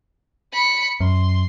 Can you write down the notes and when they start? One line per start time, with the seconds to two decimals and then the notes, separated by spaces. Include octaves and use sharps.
0.53 B5 C#7
1.00 F#2 C6